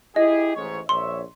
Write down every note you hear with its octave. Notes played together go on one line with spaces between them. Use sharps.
E4 G4 G#4 D#5
A1 G#2 C#5
A#1 C#5 E5 C6